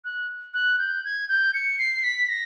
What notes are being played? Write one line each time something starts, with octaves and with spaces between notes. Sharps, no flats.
F#6
F#6
G6
G#6
G6
C#7
C7
B6
A#6